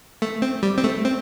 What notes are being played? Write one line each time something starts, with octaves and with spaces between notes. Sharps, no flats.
A3
C4
G3
C4
A3
C4